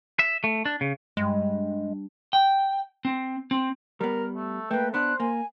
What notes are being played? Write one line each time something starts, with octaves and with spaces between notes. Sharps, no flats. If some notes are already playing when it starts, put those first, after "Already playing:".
E5
A3
D4
C#3
G2 G#3
G5
C4
C4
G3 B3 A#4
A3
A3 A#3 B4 G5
B3 D4 C5 F#6
A#3 G#5